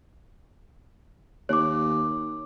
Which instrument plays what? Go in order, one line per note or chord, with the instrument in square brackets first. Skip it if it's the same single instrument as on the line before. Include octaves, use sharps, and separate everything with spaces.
[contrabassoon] D#2 [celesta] C#5 D6